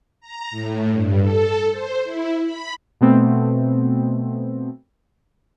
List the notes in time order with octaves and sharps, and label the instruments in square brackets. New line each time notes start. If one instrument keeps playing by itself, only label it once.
[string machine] A#5
A2
G2
A4
C5
E4
B5
[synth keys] B2 A3 B3 C4